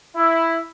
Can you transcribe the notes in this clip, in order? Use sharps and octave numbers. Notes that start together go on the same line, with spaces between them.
E4